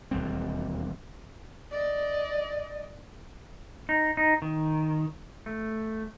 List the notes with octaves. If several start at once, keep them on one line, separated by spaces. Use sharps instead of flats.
E1 D#2 G3 C4
D5 D#5
D#4
D#4
D#3
A3